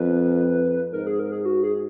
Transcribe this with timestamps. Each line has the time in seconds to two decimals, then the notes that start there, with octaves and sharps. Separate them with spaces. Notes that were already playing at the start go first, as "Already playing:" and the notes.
Already playing: F2 B4
0.93 G#2 A#4
1.07 G#4
1.19 A#4
1.32 G#4
1.45 F#4
1.63 G#4